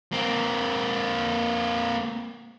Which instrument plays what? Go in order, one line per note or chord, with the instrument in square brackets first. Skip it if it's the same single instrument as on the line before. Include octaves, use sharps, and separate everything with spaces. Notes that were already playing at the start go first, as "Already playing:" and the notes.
[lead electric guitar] A#3 C4